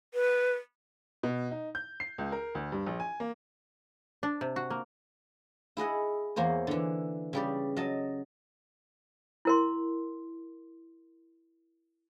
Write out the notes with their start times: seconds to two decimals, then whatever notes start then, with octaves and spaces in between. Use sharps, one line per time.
0.14 B4
1.23 B2
1.51 D#4
1.75 G6
2.00 C7
2.18 C#2
2.32 A#4
2.55 D2
2.72 G2
2.86 A#1
3.00 G#5
3.20 A#3
4.23 D4
4.41 C3
4.56 F#4
4.70 A#3
5.77 E4 G#4 D#5 F#5
6.36 E2 A#3 C5 C#5
6.67 D3 E3
7.33 C#3 G3 D5
7.77 F#3 D#5 A5
9.45 E4 A#4 C6